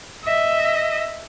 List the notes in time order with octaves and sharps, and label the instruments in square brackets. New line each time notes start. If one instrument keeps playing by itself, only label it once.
[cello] D#5 E5